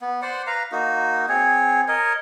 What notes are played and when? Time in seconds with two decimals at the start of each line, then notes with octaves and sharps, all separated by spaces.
0.01 B3
0.22 C5 D5 F#5
0.47 B4 F5 A#5
0.72 A#3 D#4 F#4
1.29 C4 G#4 C#5
1.88 A#4 C#5 D#5